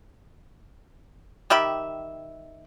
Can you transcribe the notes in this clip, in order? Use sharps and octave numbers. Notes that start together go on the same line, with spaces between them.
D#3 G4 E5 B5